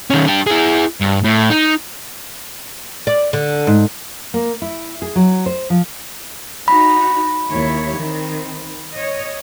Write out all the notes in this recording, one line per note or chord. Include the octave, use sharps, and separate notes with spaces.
D#3 C#4
D4 G4
E4 G#4
G2
A2
D#4
D5
D3
G#2
A#3
E4
G#4
F#3
C5
F3
D#4 F#4 B5
D#2 E4 C#5
D#3 C4
C#5 D#5